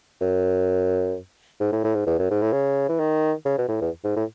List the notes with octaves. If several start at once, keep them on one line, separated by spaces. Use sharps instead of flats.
F#2
G#2
A2
A2
G#2
E2
F#2
G#2
A2
C#3
E3
D#3
C#3
B2
A2
E2
G#2
A2